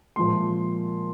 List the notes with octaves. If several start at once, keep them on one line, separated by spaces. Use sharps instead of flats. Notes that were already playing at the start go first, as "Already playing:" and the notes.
A#2 F3 G#3 C6